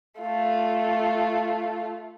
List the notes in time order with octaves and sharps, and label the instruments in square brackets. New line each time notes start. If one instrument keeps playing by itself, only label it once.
[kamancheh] A3 F4